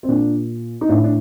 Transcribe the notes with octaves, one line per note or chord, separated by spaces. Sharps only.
C4
A#2 D4
D#4
A2 D4
D4